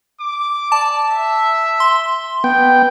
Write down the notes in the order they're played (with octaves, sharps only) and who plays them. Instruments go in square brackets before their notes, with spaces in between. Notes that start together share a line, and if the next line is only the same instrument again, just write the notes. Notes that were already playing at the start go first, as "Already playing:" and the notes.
[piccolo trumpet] D6
[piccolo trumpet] D5 [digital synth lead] A5
[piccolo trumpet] E5
[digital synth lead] C6
[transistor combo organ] B3 G5